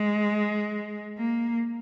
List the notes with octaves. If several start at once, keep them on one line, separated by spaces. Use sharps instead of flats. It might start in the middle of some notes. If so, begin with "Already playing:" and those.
Already playing: G#3
A#3